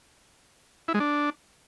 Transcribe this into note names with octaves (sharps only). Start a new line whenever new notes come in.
E4
G#3
D4